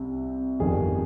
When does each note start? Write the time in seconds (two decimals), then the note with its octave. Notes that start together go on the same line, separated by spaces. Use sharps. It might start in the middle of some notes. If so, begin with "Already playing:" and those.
Already playing: C2 C3
0.59 G1 F2 D#3 G3 G#4